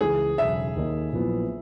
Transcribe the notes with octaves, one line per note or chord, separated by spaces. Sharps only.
C#2 C#3 E3 G#4
E1 E2 C#3 F#3 E5
D#2 D#3 A#3 D#4
A#1 A#2 F#3 B3 E4